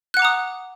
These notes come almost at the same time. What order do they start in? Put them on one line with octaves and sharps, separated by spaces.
F#6 F#5 D6 A#5 D#6